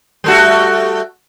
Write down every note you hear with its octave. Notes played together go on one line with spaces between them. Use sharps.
G3 A3 F#4